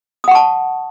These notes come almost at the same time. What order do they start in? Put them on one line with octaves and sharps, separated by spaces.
D#6 F#5 C#6 A5